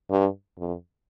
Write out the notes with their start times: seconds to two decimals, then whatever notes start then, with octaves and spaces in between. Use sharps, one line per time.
0.11 G2
0.59 F2